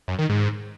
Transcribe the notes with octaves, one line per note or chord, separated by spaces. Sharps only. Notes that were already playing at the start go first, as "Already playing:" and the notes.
F#2
D#3
G#2